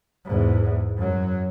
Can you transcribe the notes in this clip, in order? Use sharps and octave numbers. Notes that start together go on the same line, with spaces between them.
E2 G#2
F#2 F#3